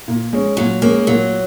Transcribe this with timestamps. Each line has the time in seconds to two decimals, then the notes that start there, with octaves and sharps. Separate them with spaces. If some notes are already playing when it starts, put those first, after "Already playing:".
0.08 A#2
0.33 G#3 C#4
0.57 A#2 F#3
0.82 G#3 A#3 C#4
1.07 A#2 F#3